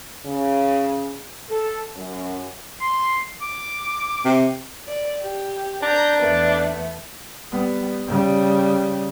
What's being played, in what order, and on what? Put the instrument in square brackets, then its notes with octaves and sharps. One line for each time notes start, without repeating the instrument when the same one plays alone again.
[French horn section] C#3
A4
F#2
[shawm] C6
D6
[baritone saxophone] C3
[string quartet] D5
G4
[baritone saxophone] D4 [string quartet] A#5 G6
[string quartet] E2 A3 B3
[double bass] G3 B3
C#3 G3